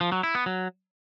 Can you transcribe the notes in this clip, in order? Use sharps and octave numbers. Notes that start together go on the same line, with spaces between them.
F3
F#3
E4
B3
F#3